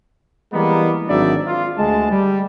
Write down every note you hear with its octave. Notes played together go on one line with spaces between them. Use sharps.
E3 G3 G#3 A#3 B3
G#1 F#3 D4 D#4 D5 E5
F4
D2 G#3 A5
G3